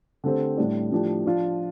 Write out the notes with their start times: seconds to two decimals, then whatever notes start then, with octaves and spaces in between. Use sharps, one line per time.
0.24 D3 A3 C4 G4 C5
0.58 A2 G3 D4
0.92 A2 F3 D4 G4
1.25 F3 D4 F4